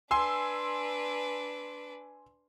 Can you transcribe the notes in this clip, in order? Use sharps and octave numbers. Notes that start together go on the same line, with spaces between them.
D4 B4 G#5 C6 E6